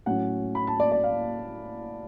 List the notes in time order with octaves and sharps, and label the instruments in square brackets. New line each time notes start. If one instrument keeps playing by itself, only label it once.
[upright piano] A2 F#3 C#4 F#5
B5
A5
D5
D5
F5